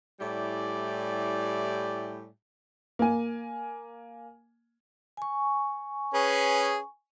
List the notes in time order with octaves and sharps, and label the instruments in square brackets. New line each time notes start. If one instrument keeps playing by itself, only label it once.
[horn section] A2 G3 E4 G4 D5 G#5
[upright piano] A#3 G#5
[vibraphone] G#5 C#6
[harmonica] C#4 G#4 B4